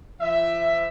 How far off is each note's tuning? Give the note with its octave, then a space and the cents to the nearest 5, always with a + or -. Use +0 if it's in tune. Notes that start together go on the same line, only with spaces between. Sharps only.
F3 -40 E5 +10